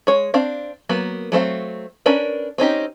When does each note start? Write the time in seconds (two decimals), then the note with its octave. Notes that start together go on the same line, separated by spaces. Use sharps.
0.07 G#3 C#5
0.34 C4 D4 F5
0.89 F#3 A#3 B3
1.32 F#3 A3 C4 F5
2.06 C#4 D4 A#4 B4
2.58 C4 C#4 D#4 G4